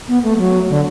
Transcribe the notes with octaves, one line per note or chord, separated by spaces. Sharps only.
B3
A3
F#3
D3